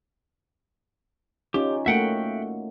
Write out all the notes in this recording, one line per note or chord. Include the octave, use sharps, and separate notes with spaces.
C#4 D#4 F4 G4
A3 A#3 F#4 E5 F#5 G5